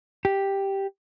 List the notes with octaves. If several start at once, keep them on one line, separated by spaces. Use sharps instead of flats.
G4